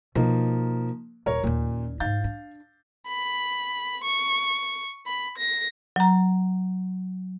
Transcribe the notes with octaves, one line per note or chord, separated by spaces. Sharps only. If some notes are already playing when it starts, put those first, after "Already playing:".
B2 F3 A#3 D#4
D#1 A#4 C#5
D#2 A#2 C#4
G#2 D#4 F5 G6 A6
D4
B5
C#6
B5
A#6
F#3 A#5